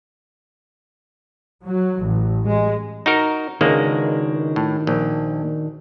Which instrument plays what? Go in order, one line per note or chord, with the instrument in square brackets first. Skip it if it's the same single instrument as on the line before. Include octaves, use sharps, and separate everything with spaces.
[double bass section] F#3
A1
G#3
[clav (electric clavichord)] D#4 F#4 A#4
[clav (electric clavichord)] C#2 G#3 A#3 [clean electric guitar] D#3 D4 F#4
[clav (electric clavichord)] A2
A#1